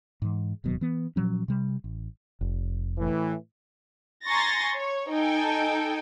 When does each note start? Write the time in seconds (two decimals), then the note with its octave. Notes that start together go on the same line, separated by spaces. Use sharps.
0.22 G#2 E3
0.64 D1 D#2 B2 F#3
0.81 E3 B3
1.16 A#2 F3 F#3 C#4
1.48 C3 G3
1.84 A1
2.41 F1
2.98 A2 E3
4.26 G#5 A#5 C6 C#6 A6 A#6
4.76 C#5
5.12 D#4 A4 G5 G#5